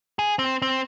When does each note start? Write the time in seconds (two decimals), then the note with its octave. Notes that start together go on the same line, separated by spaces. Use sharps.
0.19 G#4
0.39 C4
0.62 C4